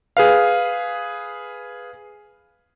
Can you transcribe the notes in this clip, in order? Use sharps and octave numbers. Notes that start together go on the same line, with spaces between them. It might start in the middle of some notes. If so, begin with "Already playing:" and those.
G#4 B4 F5